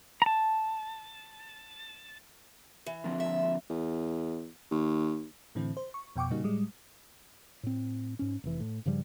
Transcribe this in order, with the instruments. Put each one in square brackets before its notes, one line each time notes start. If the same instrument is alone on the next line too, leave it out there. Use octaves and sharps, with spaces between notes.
[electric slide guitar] A5 A#5
[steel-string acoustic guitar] E3
[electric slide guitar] D3 F3 C4
[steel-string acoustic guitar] E5
[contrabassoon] E2
D#2
[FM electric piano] A2 D3 E3 C4
C5
C#6
F2 B2 G5 C#6 D6
A#2 C#3 G3 A#3 D#4 F#4
A2 G3 G#3
[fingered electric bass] A2 C4
G#2 C#4
F1 E3
A2
G2 C#3 F3 G3